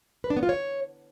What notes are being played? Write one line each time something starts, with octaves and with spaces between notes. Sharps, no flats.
B4
D4
B3
F4
C#5